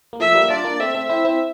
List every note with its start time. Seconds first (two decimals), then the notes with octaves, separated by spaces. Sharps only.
0.13 A#3
0.20 F3 A3 E5
0.35 G3 A#3
0.50 D4 F4 D5
0.65 A#3 D4
0.80 A3 C4 E5
0.95 A3 C4
1.09 C4 E4 E5
1.25 C4 E4